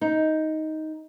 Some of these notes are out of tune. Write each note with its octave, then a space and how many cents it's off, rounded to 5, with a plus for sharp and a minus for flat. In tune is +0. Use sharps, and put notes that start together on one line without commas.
D#4 +10